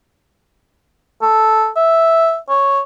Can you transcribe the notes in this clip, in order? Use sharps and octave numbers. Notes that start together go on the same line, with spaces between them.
A4
E5
C#5